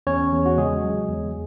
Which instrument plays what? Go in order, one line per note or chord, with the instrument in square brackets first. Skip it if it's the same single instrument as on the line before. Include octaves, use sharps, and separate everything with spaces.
[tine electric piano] E2 C#4 C#5
E2
F#4
C#3 G#3 G#4
F#3
E2